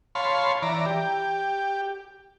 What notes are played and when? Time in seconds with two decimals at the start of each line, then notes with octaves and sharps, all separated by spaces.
0.15 C#5 F5 A5 B5 C6
0.63 E3 D5 A#5
0.86 G4